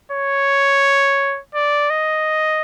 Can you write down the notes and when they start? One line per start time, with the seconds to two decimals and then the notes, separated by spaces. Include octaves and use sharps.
0.11 C#5
1.55 D5
1.90 D#5